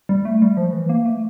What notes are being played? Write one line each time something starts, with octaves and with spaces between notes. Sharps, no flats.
G3
A3
G3
F3
E3
A#3
A3